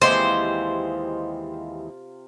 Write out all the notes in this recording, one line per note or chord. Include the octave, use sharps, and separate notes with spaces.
D#2 C3 E3 G#3 F4 C5 C6